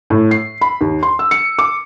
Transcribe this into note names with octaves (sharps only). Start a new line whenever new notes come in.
A2
C7
B5
D#2
C6
E6
C#7
D6